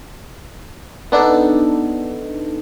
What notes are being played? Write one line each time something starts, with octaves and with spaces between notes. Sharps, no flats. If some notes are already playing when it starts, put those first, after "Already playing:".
B3 D4 D#4 A4